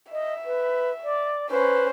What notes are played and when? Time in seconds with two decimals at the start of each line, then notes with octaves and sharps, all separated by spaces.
0.12 D#5 E5
0.45 B4
1.04 D5
1.51 C#4 B4 C5